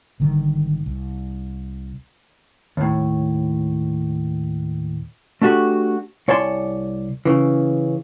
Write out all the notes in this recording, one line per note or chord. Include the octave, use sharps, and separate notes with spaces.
G#1 D3 D#3 G3
C2
D#2 A2
A3 D4 D#4 F#4 G4
C2 C#5 D5 G#5 A5 C6
C#3 E3